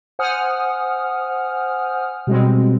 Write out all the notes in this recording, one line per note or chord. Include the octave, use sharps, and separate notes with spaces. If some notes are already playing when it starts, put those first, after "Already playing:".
C5 F#5 G#5 D#6 F6
B2 G3 G#3 C4